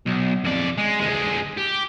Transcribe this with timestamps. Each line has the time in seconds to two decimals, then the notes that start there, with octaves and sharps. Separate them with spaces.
0.07 B1
0.44 F2 D5
0.78 G#3
1.01 D2 G#3
1.58 G4